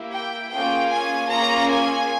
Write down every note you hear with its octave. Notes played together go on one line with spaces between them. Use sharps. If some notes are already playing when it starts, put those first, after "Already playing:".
Already playing: A#3 E4 G4
G5
A#3 C#4 F4 G#4 G5
G#5
A#3 C#4 F4 G#4 A#5
G#5